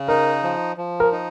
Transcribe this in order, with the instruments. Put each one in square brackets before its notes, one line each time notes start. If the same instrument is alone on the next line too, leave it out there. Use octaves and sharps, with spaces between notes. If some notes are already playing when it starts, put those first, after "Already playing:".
Already playing: [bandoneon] C#3
[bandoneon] D#4 [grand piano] A#4
[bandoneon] F3
F3
[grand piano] A#4
[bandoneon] D#4